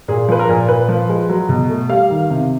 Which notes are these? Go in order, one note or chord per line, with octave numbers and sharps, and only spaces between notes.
A#2 G#4
F3 B4
A#4
A#2
A#2 B4
F3
G#3
F#3
B2
A3
G3 F5
D#3
C3